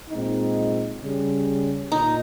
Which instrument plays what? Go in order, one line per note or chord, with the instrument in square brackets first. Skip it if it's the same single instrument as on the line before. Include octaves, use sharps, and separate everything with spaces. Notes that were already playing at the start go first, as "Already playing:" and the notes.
[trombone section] A#2 G#3 C4 D#4
C#3 G3 C#4
[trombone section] A#2 [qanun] D#4